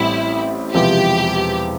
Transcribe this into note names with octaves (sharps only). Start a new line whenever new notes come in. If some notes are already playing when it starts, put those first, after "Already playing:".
Already playing: A1 A2 G3 C4 E4
E1 E2 C3 F3 B3 G4